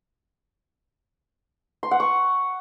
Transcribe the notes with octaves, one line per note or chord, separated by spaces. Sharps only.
C6
F#5
C#6